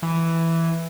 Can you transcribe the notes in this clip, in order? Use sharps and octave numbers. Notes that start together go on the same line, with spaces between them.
E3